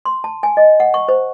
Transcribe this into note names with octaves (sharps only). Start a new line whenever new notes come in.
C6
A5
G#5
D#5
F#5
C#6
C5